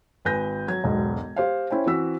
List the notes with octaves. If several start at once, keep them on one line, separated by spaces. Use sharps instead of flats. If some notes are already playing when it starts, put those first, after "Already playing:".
G#1 B4 G#5 G6 A#6
F#3 G#6
E1 B1 G#2
G4 C5 F5
C#4 E4 C5 G5
E3 C4 F#4 E6 B6